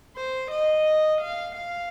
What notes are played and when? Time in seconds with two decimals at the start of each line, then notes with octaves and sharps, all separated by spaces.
0.17 C5
0.51 D#5
1.22 F5
1.56 F5